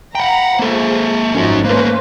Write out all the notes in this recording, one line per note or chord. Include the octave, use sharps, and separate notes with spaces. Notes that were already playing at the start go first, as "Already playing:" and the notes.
F#5 G5 A#5 B5
F3 A#3 G#4 A4
G#1 F3 C#4 D#4 F#4
A3 A#3 C#4 B4 C5